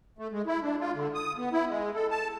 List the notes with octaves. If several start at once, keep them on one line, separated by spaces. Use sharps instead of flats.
A3
G#3
E4
D4
F4
D3
D#6
B3
E4
G#3
A4
A5